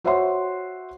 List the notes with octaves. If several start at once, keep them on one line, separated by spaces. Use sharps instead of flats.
F#4 C5 C#5 E5 F#5 C6